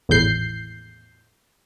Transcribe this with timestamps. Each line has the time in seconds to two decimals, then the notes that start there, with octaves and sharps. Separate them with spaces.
0.09 G#1 E2 A2 G6 C7